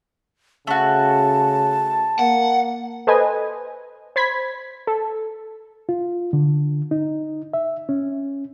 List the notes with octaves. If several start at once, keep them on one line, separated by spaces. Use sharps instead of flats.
C#3 A3 F#4 A5
A#3 F#5
A4 B4 C5 D#5 G#5
C5 B5 G#6 B6
A4
F4
D3
D#4
E5
C#4